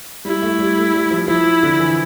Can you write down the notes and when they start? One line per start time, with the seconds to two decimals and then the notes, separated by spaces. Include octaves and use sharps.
0.25 G3 E4
0.42 A3
0.59 G3
0.77 A3
0.94 G3
1.11 F3
1.28 F3 E4
1.63 D3
1.80 E3